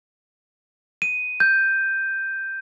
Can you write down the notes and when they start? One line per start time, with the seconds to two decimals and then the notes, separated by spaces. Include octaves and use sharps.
1.02 D#7
1.40 G6